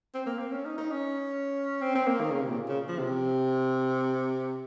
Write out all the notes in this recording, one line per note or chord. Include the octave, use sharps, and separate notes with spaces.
C4
A#3
C4
C#4
D#4
D#4
C#4
C4
C4
A#3
D#3
C#3
C3
A#2
C#3
F3
C3